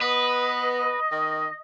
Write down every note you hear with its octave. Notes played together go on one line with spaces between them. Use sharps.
B3 B4 D#5
D#3